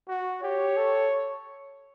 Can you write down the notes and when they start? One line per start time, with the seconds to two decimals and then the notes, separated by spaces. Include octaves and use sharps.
0.08 F#4
0.42 G4 C#5
0.77 A4